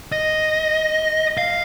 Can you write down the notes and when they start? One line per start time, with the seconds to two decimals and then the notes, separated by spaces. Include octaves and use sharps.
0.12 D#5
1.38 F5